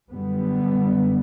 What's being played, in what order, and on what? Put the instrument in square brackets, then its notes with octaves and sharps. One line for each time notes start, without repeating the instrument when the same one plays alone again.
[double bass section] F#2 D3 G3 B3